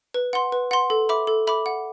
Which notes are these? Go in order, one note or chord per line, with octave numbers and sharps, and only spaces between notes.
B4
F#5 C6
B4
F#5 C6
A4
E5 B5 D6
A4
E5 B5 D6
F#5